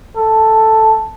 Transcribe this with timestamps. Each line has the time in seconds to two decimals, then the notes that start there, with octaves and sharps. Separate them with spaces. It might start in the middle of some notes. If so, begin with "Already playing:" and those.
0.16 A4